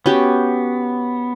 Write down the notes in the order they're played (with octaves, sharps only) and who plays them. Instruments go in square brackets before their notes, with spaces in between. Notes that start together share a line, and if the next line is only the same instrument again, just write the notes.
[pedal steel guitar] B3 [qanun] C#4 F#4 G4